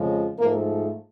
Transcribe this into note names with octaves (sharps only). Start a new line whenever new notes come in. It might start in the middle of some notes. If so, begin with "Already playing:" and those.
Already playing: F2 C#3 F3 G#3
G#2 F3 A3 A#3